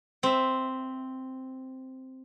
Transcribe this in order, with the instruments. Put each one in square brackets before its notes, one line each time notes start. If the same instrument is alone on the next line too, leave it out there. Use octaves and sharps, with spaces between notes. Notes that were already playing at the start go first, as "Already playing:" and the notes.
[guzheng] C4 E5